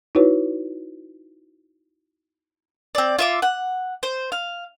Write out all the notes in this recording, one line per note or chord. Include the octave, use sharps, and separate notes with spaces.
D#4 E4 F#4 B4 C#5
C4 D5
F4 E5 D6
F#5
C5
F5